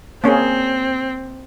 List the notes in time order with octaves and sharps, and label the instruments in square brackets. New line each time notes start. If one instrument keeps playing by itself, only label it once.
[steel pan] A#3 C#4 G#4 [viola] C4